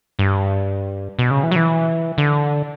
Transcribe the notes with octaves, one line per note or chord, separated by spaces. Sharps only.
G2
B2
C#3
E3
F#3
E3
D3